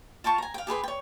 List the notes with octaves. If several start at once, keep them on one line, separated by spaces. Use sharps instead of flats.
F4 G5 A5 C#6
G#5 A#5
F5 G5
G4 G#4 B4 C6
C#5 G5